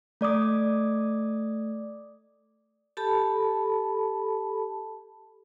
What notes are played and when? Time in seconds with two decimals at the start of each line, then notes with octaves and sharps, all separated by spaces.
0.21 A3 D5 D6 D#6
2.97 G4 A4 A5 B5